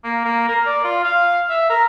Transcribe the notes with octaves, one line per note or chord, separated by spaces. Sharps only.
A#3
A#3
A#4
D5
F4
F5
E5
A#4